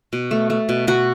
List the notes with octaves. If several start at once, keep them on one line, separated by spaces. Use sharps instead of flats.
B2
A3
A3
B2
B2 F#4